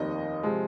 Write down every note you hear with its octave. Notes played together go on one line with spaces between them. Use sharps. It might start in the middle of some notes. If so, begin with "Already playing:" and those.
Already playing: F1 D#2 D#3 D#5
C3 F3 G#3